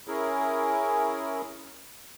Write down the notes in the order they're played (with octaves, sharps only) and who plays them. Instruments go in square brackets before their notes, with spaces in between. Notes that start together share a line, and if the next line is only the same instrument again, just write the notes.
[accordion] C#4 E4 G#4 A#4